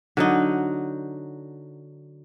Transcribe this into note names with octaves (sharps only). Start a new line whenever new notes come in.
D3 F#3 D#4